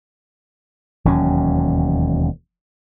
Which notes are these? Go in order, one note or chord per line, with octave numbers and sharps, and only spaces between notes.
E1 D#2 F#3 C#4